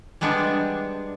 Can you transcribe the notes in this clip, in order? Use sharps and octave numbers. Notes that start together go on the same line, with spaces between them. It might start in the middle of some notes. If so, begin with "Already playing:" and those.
G3 G#3 B3 D4